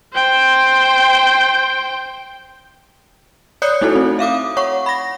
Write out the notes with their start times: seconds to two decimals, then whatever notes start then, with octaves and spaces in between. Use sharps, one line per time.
0.14 C5 G5
3.62 C#5 D5 D#6 F#6 G6 C#7
3.81 A3 D#4 E4 F#4 A4
3.95 C4
4.19 E5 F5 D6 D#6
4.57 C#5 F#5 C#6
4.86 B5 A#6